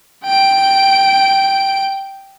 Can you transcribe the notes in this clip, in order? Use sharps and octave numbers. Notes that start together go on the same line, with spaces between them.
G5 D7